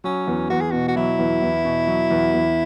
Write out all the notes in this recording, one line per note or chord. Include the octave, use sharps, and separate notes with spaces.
F#3 C#4
E2
E2 F#4
G#4
B2 F#4
F#4
F#3 E4
E2
E2
B2
F#3
E2
E2